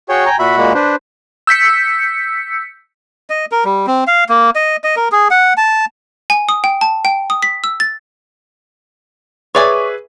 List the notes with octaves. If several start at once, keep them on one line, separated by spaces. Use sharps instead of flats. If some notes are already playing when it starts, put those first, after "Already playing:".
F#4 G#4 C#5 G5
G5 G#5 A#5
A#2 F#4 E5 B5
A#2 G#3 A#3
D4 B4 C5
E6 G6 B6 C#7
D#5
A#4
G3
C4
F5
A#3
D#5
D#5
A#4
G#4
F#5
A5
G#5
D#6
G5
A5
G5
D#6
B6
E6
A6
G#4 B4 C#5 D5 E5 G#5